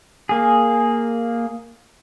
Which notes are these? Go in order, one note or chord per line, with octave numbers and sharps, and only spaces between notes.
A#3 G#4